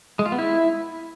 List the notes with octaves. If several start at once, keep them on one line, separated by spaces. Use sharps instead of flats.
G#3
F4
B3
E4